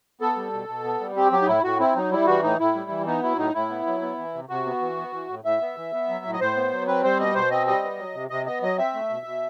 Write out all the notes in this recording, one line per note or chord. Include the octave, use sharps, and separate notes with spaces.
B3 A4
G3
B2
B2
B3
G3
C4 G4
F#3 G4
D#4
A2 E4
A2 F#4
C4 E4
F#3 D#4
G3 E4
E3 F#4
A2 D#4
A2 E4
G3
E3
B3 D#4
F#3 E4
A2 D#4
A2 E4
B3
F#3
B3
E3
C3
C3 F#4
B3
E3
B3
E3
A2
A2 E5
B3
E3
B3
F#3
A2
D#5
A2 C5
B3
F#3
C4 B4
G3 C5
B2 D#5
B2 C5
C4 D#5
G3 D#5
B3
F#3
C3
C3 D#5
B3 D#5
F#3 D#5
C4 E5
A3
B2
B2